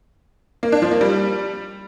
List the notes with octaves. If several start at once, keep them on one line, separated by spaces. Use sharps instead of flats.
A#3
D4
F3
A#3
G3